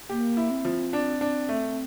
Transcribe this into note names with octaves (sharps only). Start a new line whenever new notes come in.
A#3 G4
E4
C4
F3
D4
D4
A3